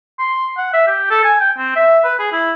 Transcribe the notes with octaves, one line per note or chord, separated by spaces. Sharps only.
C6
F#5
E5
G4
A4
G#5
G5
C4
E5
B4
G#4
E4